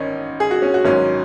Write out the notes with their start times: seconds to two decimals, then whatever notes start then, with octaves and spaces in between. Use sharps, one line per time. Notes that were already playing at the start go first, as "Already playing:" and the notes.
Already playing: G#1 C#4 D#4
0.40 G#4
0.51 F#4
0.62 C#4
0.74 F#4
0.85 G#1 G#2 F#3 C#4